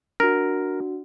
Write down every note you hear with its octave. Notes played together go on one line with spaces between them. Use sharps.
D4 F#4 A#4